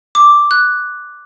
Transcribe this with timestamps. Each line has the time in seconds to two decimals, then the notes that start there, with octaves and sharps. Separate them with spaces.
0.15 D6
0.51 F#6